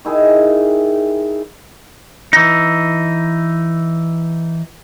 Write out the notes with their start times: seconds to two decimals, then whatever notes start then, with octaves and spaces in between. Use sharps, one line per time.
0.05 D#3 E4 G#4
2.33 E3 D#4